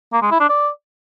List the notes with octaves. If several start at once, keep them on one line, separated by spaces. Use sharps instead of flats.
A#3
G#3
E4
D4
D5